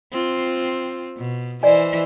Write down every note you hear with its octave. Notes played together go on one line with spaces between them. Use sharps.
C4 F4
B2
E3 C5 D5 D#5 G#5